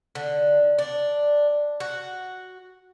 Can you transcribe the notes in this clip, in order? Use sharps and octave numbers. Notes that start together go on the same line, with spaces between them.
D3
D4
F#4